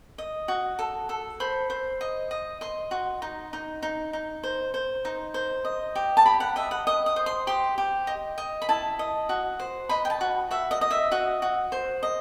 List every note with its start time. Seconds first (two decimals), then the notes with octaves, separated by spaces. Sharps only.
0.18 D#5
0.48 F#4
0.79 A4
1.09 A4
1.40 C5 B5
1.70 C5
2.01 D#5
2.31 D#5
2.61 D#5 C6
2.91 F#4
3.22 D#4
3.53 D#4
3.83 D#4
4.13 D#4
4.43 C5
4.74 C5
5.05 D#4
5.34 C5
5.65 D#5
5.95 G4
6.17 A5
6.26 G4 B5
6.40 F#5
6.56 D#5 E5
6.71 F#5
6.87 D#5 D#6
7.06 D#6
7.16 C5
7.26 C6
7.47 G4 C6
7.78 G4
8.07 D#5
8.38 D#5
8.62 B5
8.69 E4 A5
8.99 D#5
9.29 F#4
9.59 C5
9.89 D#5 B5
10.05 G5
10.10 A5
10.21 F#4
10.51 F#4 E5
10.71 D#5
10.81 D#5
10.91 E5
11.12 F#4 D#5
11.42 F#4
11.72 C5
12.03 D#5